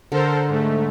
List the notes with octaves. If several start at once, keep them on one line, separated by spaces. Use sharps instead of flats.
D3 A4 A#4 C5
G#2 A3